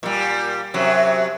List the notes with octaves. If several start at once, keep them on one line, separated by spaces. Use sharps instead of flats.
A#2 G3
F#2 C3 F#3